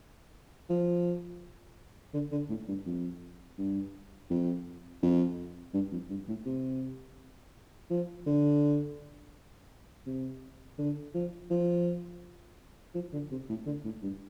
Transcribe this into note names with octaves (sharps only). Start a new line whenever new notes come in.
F3
D3
D3
A2
G2
F2
G2
F2
F2
G2
F2
G2
A2
C3
F3
D3
C3
D3
F3
F3
F3
D3
C3
A2
D3
A2
G2